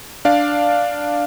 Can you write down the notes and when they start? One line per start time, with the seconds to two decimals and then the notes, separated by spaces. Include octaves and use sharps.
0.25 D4 D5 F5